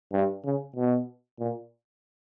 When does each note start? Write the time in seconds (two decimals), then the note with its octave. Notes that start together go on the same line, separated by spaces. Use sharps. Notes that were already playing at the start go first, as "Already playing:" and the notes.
0.13 G2
0.45 C#3
0.76 B2
1.39 A#2